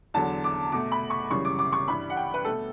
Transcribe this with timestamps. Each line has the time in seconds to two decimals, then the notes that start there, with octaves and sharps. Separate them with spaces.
0.14 E2 D3 F#3 A5
0.44 D6
0.72 B2 A3 D6
0.92 B5
1.10 C#6
1.30 F#2 C#3 E3 G3 C#6
1.45 D6
1.59 D6
1.72 C#6
1.88 G2 E3 G3 B5
2.10 F#5
2.17 G5
2.34 B4
2.45 B2 A3 A4